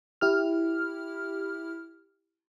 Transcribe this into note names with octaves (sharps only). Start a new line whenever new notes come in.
E4 G4 F6